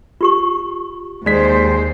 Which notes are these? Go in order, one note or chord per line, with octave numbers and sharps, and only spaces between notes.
F4 G4 C#6
D#2 G#3 C5 D5 B6